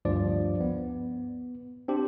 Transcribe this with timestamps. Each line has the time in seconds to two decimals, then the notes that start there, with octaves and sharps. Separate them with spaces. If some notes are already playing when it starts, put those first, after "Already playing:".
0.05 D2 G2 F3 D5
0.60 B3
1.88 C4 D4 G4